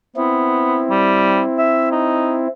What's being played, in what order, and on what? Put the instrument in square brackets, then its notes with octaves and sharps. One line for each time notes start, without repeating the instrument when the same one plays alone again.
[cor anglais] B3 [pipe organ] C4 E4
[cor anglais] G3
E5
D#4